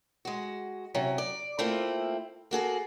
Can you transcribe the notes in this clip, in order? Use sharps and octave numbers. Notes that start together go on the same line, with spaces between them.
G#3 F#4
C3 F#3 C#4
D5
A3 A#3 C4 E4 F4
A#3 F#4 G#4 A4